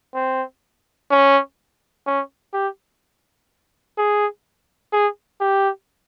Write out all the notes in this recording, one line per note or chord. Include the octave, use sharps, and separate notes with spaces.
C4
C#4
C#4
G4
G#4
G#4
G4